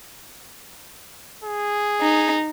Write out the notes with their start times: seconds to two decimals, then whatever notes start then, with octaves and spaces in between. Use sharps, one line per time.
1.44 G#4
2.01 D#4